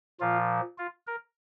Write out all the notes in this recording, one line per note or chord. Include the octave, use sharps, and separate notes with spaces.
A#2 F3 F4
F4
A#4